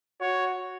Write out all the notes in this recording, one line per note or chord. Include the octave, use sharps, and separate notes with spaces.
F#4 C#5